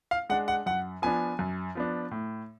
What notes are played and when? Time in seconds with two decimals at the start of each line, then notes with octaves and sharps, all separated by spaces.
0.11 F5
0.30 G#3 D4 F#5
0.48 F#5
0.66 F#2 F#5
1.02 F3 B3 D4 G#5
1.39 F#2
1.75 F3 B3 D4
2.11 A2